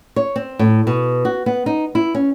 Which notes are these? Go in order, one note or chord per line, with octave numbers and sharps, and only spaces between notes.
C#5
C4
A2
B2
F#4
B3
D#4
E4
C#4